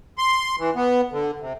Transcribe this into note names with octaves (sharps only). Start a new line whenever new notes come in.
C6
E3
B3
D3
C3